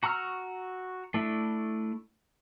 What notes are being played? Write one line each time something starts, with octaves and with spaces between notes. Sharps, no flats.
F#4 A#5 C#6 E6 F6
A3 D4 E4